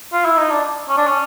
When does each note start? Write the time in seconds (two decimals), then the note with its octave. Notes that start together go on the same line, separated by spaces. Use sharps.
0.12 F4
0.25 E4
0.37 D#4
0.50 D4
0.88 C#4
0.97 D4
1.07 C#4